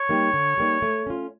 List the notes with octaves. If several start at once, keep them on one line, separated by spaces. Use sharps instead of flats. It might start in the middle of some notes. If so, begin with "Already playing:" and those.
Already playing: C#5
G3 A#3 D#4
D3
G3 A#3 D#4
A3
C#4 F4